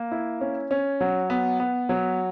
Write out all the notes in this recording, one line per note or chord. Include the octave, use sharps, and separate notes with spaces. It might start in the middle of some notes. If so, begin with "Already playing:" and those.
Already playing: A#3
E4
C#4
C#4
F#3
B3
B3
F#3